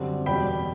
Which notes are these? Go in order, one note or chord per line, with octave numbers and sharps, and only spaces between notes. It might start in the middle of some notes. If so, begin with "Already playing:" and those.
Already playing: F#2 D3 G3 C4
E2 B2 G3 G5 B5